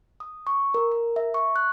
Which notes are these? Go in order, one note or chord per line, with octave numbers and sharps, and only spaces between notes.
D#6
C#6
A#4
A#4
E5
C#6
F#6